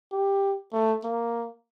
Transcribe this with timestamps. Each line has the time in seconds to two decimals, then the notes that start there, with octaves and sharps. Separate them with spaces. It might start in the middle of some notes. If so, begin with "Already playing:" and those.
0.12 G4
0.73 A3
1.04 A#3